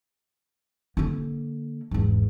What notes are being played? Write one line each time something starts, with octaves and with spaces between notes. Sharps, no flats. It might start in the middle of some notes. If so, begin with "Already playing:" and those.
D3 A#3
G#1 E2